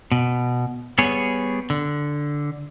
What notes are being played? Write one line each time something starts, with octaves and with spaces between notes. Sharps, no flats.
B2
G3 B3 G#4 C#5
D3